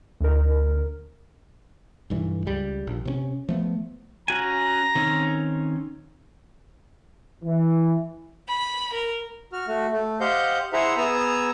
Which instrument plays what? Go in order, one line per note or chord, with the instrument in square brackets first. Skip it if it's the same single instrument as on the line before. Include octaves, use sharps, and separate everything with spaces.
[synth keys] D2 A#4
[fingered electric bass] B1 G2 E3
C#2 G3
A#1
C3 C4 C#4
F3 A3 B3
[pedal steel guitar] C#4 F#4 G#5 [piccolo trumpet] A#5
[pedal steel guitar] D#3 C4 C#4
[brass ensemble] E3
[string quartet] B5
A#4
[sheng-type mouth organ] F#4 F6
A3 F#4
A3
G4 C5 D#5 F5 F#5 G6
E4 G#4 C5 E5 F#5 A#5
B3 G#4 G#5 A#5 E6